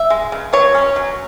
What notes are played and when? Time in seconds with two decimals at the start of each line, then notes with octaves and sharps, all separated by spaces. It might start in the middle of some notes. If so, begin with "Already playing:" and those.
Already playing: E5
0.10 G#3
0.32 C#3
0.53 F#3 C#5
0.75 C#4
0.96 F#3